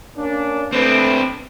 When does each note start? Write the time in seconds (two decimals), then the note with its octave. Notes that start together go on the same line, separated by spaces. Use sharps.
0.16 A#3 C#4 D4
0.72 A3 C4 D4 B4